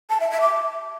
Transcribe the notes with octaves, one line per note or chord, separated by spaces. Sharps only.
A5
E5
E5
D6